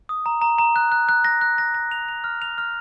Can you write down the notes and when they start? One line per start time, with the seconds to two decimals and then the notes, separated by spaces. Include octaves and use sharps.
0.09 D#6
0.26 A#5
0.42 A#5
0.58 A#5
0.76 F#6
0.92 F#6
1.09 F#6
1.24 A#6
1.41 F#6
1.58 A#6
1.75 A#6
1.91 F7
2.08 F7
2.24 F6
2.42 F7
2.58 F6